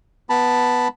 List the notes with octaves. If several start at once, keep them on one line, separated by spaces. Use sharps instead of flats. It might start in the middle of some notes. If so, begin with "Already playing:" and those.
B3 A5 B5